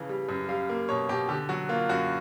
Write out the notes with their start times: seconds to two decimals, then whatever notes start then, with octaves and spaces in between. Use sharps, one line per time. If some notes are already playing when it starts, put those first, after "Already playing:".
Already playing: F2 C#3 E3 F5
0.09 G3
0.29 F#2
0.49 G3 F5
0.69 A#3
0.89 B2 C#5
1.09 B2 G4
1.29 D3 G4
1.49 F#3 F#4
1.69 A#3 F4
1.89 F#2 F#4